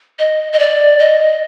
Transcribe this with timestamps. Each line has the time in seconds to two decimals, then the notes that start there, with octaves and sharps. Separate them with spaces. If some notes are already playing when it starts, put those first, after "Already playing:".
0.19 D#5
0.53 D#5
0.59 D5
0.99 D#5